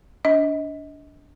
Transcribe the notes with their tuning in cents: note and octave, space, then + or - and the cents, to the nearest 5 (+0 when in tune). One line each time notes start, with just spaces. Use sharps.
D4 -25 D#5 +30